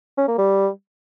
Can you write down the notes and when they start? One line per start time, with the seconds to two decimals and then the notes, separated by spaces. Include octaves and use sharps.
0.18 C#4
0.28 A#3
0.38 G3